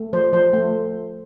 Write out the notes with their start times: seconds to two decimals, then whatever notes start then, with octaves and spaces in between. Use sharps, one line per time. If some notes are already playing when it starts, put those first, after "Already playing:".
Already playing: A3
0.13 F3 C5
0.33 F3 C5
0.53 A3